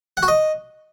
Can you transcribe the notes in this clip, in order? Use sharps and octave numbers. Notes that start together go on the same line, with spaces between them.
F#5
F#4
D#5